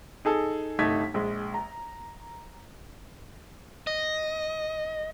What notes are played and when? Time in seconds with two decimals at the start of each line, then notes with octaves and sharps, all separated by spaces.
0.25 D#4 G#4 A4
0.79 G1 C2 A3 D#4 G#6 B6
1.14 A#1 G#3
1.54 A#5
3.87 D#5